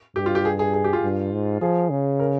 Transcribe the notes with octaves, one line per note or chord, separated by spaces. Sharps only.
G2 G4
F4
G4
G#4
G#4
G#4
G4
F4
G2
G#2
F3 G#4
C#3
A#4